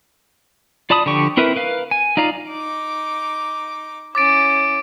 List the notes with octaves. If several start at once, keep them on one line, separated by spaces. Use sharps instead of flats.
F4 D5 A5 B5 D#6
D3 F3 G4 C#6
C4 E4 A#4 B4 E5
A#4 B4 F5
G#5
D#4 F4 D5 F5 A#5
D#4 D6
C#4 E4 D6 A6 D7